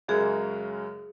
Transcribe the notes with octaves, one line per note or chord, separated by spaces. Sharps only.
F#2 C#3 G#3 F#4 G#4 A#4